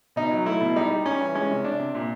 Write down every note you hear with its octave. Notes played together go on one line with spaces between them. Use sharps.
B2 D#4
F#3
A3 E4
B2
G3 D#4
G3
G3 C#4
E3
G#3 C#4
C3
C3 D4
C3
A#2